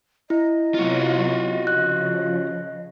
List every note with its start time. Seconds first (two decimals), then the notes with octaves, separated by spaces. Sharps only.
0.30 E4 D#5
0.75 C3 F#3 B3 F4 F#4
1.67 C#3 F3 F#6